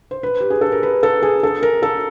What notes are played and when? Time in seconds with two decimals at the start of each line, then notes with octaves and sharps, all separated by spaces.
0.11 C5
0.23 B4
0.40 G4
0.50 G#4
0.61 A4
0.72 A#4
0.83 B4
1.03 A4
1.23 G#4
1.43 A4
1.63 A#4
1.83 A4